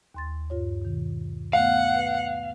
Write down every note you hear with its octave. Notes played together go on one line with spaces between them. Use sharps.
D#2 C6 A6
G2 F4 C#5
B2 D#3
A3 B3 F5 F#5
B4